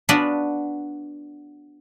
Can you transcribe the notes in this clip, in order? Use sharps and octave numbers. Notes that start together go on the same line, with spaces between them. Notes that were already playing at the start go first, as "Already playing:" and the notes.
B3 D4 F#4 B4 D5 F5